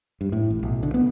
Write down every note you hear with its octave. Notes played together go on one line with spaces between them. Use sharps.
G2
A2
A1
B1
D3
B3